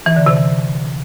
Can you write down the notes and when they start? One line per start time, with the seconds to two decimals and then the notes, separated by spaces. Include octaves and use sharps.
0.06 E3
0.16 D3
0.26 C3
0.37 E3